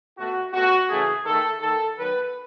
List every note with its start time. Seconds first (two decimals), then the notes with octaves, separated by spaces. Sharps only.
0.18 B2 A3 F#4
0.54 B2 A3 F#4
0.89 C#3 E3 A3 G#4
1.25 D#3 A3 A4
1.61 D#3 A3 A4
1.96 D#3 F#3 B3 B4